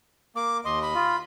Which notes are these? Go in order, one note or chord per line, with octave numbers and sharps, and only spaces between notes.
A#3 D6
D#2 D#5 C6
B5
F4